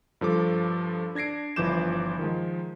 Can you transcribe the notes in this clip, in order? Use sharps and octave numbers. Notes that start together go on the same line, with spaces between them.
G2 F3 A4 D6
D4 G#6 A#6 C7 D7
G1 E3 F3 D6 G6 E7
D#3 F3 G#3